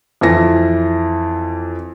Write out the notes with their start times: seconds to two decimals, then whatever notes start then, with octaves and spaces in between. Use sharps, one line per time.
0.21 F2 E3 A#6